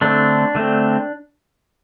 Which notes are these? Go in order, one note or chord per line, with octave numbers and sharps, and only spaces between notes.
D3 A3 C4 D4
D3 A3 C4